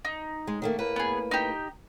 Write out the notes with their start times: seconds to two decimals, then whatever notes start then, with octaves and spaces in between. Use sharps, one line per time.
0.05 D#4
0.47 G#3
0.62 D#3 A3 A#3
0.78 A2 A#3 B4
0.96 B3 G#4
1.31 D#4 G4